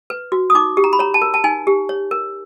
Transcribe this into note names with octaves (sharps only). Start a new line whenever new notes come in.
B4
F#4
D#6
D#4 D6
G4
A#5
B5
C#5 A#5
A5
A#4
A5
D#4 G#5
G4
C#5
A#4